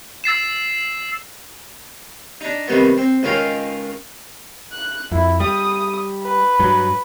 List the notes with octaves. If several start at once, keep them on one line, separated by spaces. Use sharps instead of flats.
E6 A6 C7 E7
D4 D#4
C3 D#3 G3 B3
C4
C#2 D#3 C#4 F4 F5 G5
F#6
F2 E4
G3 D#6
B4
G2 F#3